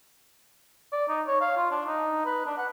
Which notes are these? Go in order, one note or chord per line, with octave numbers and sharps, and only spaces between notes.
D5
D#4
C#5
F5
F4
D4
D#4
B4
D4
F#5